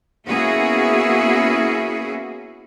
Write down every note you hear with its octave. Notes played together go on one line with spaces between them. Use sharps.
A#3 B3 C#4 E4 F#4 G#4